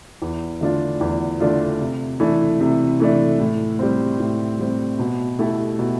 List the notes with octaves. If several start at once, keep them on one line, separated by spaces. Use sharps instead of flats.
E2
D3 A3 D4 F4
E2
D3 A3 D4 F4
C3
E3 A3 D4
C3
E3 A3 D4
A2
G3 C4
A2
G3 C4
B2
A3 E4 G4
B2